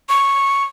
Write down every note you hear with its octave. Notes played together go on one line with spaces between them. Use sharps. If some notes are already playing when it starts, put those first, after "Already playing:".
C#6